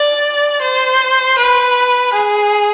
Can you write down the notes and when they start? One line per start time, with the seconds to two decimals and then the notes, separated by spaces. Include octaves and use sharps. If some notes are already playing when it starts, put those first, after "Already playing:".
Already playing: D5
0.62 C5
1.38 B4
2.13 G#4